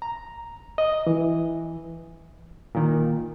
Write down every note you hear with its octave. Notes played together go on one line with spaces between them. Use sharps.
A#5
D#5
E3
A#2 D#3